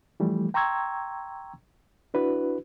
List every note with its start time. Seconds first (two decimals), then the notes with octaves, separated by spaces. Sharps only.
0.20 E3 F3 G3 A3
0.54 G5 A#5 C6 C#6 E6 G#6
2.14 D4 E4 F#4 B4